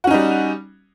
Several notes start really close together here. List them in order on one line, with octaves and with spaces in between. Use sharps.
F#4 C#4 D#4 G3